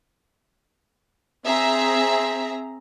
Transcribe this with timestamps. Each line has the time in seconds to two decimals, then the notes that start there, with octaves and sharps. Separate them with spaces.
1.46 C4 G#4 E5 A#5